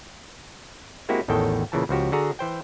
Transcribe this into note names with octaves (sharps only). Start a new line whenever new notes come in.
G#3 A#3 C4 E4 F#4 G4
A1 E2 A2 D#3 A4 G5
A#2 C#3 E3 A5
C#2 F3 F#4 G4
D3 F#4 G#4 A#5
E3 C5 G5